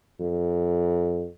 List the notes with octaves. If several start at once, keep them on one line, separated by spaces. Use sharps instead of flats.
F2